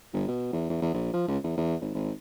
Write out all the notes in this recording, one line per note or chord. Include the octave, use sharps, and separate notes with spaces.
G1
B2
E2
E2
E2
A#1
F3
C#2
E2
E2
G#1
G#1